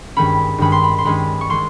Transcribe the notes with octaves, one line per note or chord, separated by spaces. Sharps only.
G2 D#3 G#3 C#4 B5
G2 D#3 G#3 C#4 B5
C6
B5
C6
G2 D#3 G#3 C#4 B5
C#6
D#3 G#3 C#4 C6